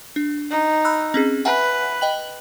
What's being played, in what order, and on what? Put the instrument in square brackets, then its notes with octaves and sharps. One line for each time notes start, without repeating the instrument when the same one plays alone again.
[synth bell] D4
[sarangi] D#4
[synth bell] B5 E6 F#6
C4 C#4 G#4
[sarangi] B4 [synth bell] E5 F#5 G#5
[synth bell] D#5 G5 F#7